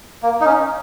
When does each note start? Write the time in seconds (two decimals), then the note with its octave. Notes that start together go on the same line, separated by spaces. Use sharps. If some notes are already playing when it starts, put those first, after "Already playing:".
0.23 A#3
0.41 D#4
0.45 C#4